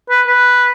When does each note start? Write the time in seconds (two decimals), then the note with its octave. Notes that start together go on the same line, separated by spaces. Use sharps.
0.10 B4
0.27 B4